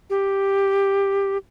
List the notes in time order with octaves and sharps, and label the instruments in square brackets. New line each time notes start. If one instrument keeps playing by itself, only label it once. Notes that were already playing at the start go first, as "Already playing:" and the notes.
[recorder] G4